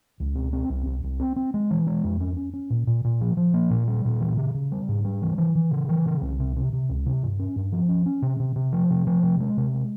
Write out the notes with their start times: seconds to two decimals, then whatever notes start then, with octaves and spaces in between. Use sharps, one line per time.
0.20 C#2
0.35 C4
0.53 C4
0.70 C2
0.86 C2
1.03 C2
1.19 C4
1.36 C4
1.54 G#3
1.71 E3
1.87 G#3
2.04 F2
2.20 C#4
2.36 C#4
2.54 C#4
2.70 A#2
2.87 A#2
3.04 A#2
3.21 F3
3.37 F3
3.54 A#3
3.70 A#2
3.88 G3
4.05 A#2
4.20 E3
4.37 C#3
4.54 C#3
4.72 G3
4.88 G#2
5.04 G3
5.22 E3
5.38 E3
5.55 E3
5.71 C#3
5.89 E3
6.06 C#3
6.22 C2
6.39 C3
6.56 C3
6.73 C3
6.89 C#2
7.06 C3
7.23 G2
7.39 C#4
7.56 G2
7.72 F3
7.89 C#4
8.06 C#4
8.22 C3
8.40 C3
8.56 C3
8.73 F3
8.90 C3
9.07 F3
9.23 C3
9.40 G#3
9.57 C3
9.74 G#3